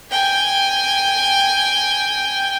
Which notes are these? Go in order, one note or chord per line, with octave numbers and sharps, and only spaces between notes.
G5 G#5